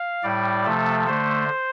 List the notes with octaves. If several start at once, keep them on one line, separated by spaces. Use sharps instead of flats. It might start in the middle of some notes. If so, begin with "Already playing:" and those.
Already playing: F5
A2 G3 D5
C3 F3 A3 A4
D3 A3 C5